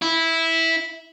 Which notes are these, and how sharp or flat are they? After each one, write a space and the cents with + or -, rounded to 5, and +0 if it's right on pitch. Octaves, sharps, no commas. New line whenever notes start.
E4 -10